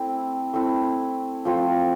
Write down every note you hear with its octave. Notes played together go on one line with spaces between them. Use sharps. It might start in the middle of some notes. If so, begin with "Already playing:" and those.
Already playing: A3 C4 E4
A3 C4 E4
F3 A3 C4 F4